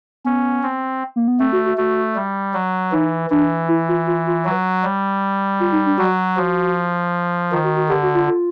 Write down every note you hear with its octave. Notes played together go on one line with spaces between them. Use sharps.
B3 C#4
C4
A#3
B3
A3 C4
F#4
F#4
A3 F#4
G3
F#3
E3 D#4
E3 D4
E4
F4
F4
F4
F#3
G3
F4
D#4
D4
F#3 F#4
F3 F#4
D#3 F4
F#4
F#4
D3 G4
F#4
F4
F4